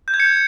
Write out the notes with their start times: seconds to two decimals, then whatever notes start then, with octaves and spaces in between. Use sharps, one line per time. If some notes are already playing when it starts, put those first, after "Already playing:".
0.08 G6
0.14 G#6
0.20 C#7